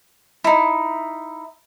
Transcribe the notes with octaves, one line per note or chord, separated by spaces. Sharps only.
D#4 E4